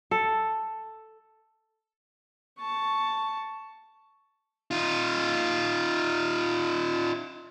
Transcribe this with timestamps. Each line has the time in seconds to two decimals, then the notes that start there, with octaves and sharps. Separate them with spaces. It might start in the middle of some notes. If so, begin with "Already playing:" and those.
0.11 A4
2.59 A5 C#6
4.71 D#4 F4